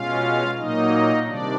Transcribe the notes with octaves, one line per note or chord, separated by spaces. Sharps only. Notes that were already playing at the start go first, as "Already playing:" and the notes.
Already playing: B2 G#3 C#4 F4 F5
A#2 F#3 A#3 D#4 D#5
C3 D#3 G3 D4 D5